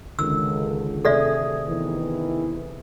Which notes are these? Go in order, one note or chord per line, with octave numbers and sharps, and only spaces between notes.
C#2 D3 D#3 E6
C3 A3 G#4 A4 D5 E5
E2 D#3 E3